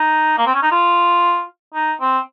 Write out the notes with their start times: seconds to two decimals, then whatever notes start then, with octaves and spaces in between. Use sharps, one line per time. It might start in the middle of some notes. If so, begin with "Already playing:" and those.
Already playing: D#4
0.38 A#3
0.47 C4
0.54 C#4
0.63 D#4
0.71 F4
1.74 D#4
2.01 C4